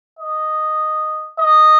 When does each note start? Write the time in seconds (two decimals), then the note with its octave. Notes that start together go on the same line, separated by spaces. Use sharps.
0.19 D#5
1.40 D#5